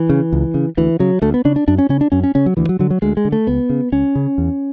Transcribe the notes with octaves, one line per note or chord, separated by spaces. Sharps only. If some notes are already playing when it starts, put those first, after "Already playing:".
Already playing: E3
C#3
C#2
C#3
D2 E3
C#3 F#3
D2 A3
B3
C#3 D4
D4
F#2 D4
C#4
C#3 C#4
D4
F#2 C#4
C#4
C#3 C#4
F#3
D2 E3
F#3
D3 F#3
F#3
D2 G#3
G#3
D3
A3
C#2 B3
C#3
C#2 C#4
C#3
E2